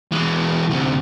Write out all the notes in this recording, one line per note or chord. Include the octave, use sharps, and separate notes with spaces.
E3 G#3
D2 C3